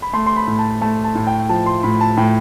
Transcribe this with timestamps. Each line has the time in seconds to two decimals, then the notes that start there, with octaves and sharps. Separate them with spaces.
0.02 B5
0.13 A3 C6
0.26 C6
0.36 B5
0.47 A2
0.59 A5
0.81 A3 A5
1.04 A5
1.15 A2
1.27 G5
1.49 F3 A5
1.66 C6
1.83 A2 B5
2.01 A5
2.17 A2 G5